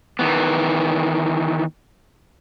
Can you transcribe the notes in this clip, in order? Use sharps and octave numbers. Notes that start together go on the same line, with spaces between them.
D#3 E3 B3